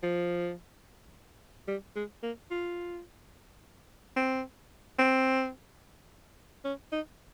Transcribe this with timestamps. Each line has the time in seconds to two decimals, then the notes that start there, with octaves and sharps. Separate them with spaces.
0.03 F3
1.68 G3
1.96 G#3
2.23 A#3
2.51 F4
4.16 C4
4.99 C4
6.65 C#4
6.92 D#4